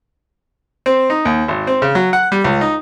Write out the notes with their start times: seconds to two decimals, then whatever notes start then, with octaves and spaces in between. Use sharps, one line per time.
0.86 C4
1.10 D#4
1.25 D#2
1.48 G#1
1.67 C4
1.82 C#3
1.95 F#3
2.13 F#5
2.32 G3
2.44 C#2
2.61 D#4